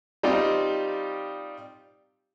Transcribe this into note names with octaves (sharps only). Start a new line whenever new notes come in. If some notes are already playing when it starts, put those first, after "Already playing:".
G3 C4 D#4 F4 G4